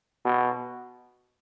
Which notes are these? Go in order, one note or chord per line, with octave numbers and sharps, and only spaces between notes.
B2